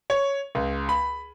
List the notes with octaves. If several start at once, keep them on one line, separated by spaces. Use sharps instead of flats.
C#5
C#2
B5